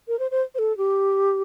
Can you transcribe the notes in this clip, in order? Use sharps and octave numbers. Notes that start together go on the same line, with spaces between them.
A#4
C5
C5
C5
A4
G4